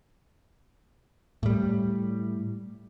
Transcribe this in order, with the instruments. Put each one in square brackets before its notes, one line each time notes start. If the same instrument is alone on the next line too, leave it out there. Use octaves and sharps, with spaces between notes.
[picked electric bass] A2 G3